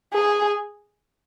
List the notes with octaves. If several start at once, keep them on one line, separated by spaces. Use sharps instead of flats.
G#4